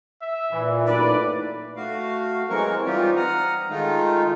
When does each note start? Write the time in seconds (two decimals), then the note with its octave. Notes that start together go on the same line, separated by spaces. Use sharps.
0.22 E5
0.53 A#2 E3
0.87 F#2 A2 D#4 B4 D5
1.76 A3 F#4 F5
2.50 E3 F#3 G#3 C4 A#4 C#6
2.86 E3 G3 C4 D#4 F4 G4
3.16 F#5 A#5 D#6 F6
3.70 D#3 G#3 A3 D#4 F4